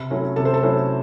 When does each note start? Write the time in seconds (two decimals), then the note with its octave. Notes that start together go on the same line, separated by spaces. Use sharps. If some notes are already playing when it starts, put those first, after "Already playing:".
Already playing: C3
0.10 F#3 A3 C#4 E4
0.36 C3 A4
0.45 C5
0.54 A4
0.63 F#3 A3 C#4 E4